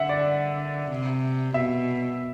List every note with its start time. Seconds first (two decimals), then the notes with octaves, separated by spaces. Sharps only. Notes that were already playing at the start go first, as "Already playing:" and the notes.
Already playing: D3 E5 F#5
0.09 D5
0.90 C3
1.54 B2 E5